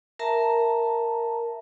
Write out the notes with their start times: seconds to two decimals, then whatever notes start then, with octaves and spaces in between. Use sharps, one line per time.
0.19 A#4 E5 A5 A#5